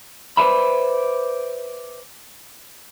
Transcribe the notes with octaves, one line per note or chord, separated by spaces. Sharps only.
B4 C5 D5 E5 B5